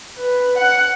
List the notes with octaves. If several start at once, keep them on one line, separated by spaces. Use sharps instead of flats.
B4
F#5